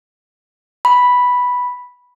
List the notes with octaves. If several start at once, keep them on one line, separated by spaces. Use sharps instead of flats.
B5